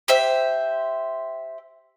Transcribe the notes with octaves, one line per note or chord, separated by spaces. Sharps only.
G4 C5 E5